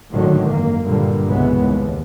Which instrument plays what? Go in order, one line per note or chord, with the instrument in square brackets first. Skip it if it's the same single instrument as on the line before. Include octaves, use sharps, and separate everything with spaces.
[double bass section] G#1 A2 D3 D#3 F#3
F#2 A#3
G2 A#2 D3 G3 A#3
C2 F#2 C#3 E3 G#3 B3
D#2